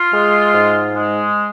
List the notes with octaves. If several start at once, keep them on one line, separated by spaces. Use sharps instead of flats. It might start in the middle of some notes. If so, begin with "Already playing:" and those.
Already playing: F4
G#3
G#2
G#3